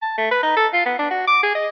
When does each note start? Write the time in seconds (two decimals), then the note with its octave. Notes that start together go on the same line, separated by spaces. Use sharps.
0.02 A5
0.18 A3
0.31 B4
0.43 D#4
0.56 A4
0.73 F4
0.86 B3
0.99 D4
1.11 F#4
1.27 D6
1.43 G#4
1.55 D#5